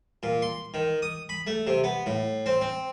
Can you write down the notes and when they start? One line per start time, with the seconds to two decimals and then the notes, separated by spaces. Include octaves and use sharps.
0.23 A#2
0.42 C6
0.74 D#3
1.02 D#6
1.29 B5
1.47 A3
1.67 C3
1.84 B3
2.06 A2
2.46 C4
2.61 C4